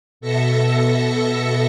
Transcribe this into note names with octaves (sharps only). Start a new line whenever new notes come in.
B2 A4 E5 A#6 C#7